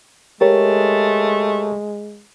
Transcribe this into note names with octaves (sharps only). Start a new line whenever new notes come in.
G#3 A3 G4 A#4 C#5